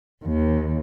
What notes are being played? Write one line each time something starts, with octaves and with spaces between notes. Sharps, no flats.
D#2